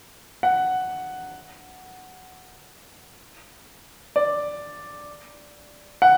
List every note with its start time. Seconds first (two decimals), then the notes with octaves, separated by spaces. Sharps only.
0.43 F#5
4.16 D5
6.02 F#5